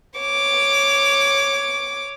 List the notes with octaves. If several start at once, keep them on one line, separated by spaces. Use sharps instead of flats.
C#5 D6